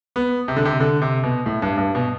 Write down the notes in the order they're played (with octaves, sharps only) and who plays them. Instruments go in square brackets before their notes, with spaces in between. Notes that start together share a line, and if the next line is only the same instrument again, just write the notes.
[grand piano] B3
C3
D3
C3
D3
C3
B2
A2
G2
G2
B2